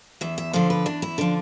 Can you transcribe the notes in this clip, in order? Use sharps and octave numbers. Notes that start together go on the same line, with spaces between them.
E2 E5
E5
D3 F3 C5
B4
E2 D4
E4
D3 F3 D4